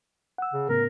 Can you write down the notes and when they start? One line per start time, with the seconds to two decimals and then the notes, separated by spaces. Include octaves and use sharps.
0.38 F#5 E6
0.53 C#3
0.69 A2 C#3 B3 A#4